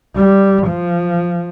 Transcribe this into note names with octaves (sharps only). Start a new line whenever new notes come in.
G3
F3